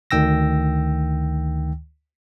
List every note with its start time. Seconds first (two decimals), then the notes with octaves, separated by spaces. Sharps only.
0.11 D2 D#3 G5 E6 A#6